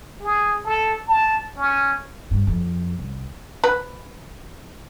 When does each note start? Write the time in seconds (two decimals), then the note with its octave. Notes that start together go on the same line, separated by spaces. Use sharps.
0.20 G#4
0.65 A4
1.08 A5
1.56 C#4
2.31 G2
2.47 F2
2.98 C2
3.64 B4